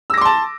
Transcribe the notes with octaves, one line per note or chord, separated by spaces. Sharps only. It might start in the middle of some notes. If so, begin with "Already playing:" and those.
A5 C6 D6 E6 A#6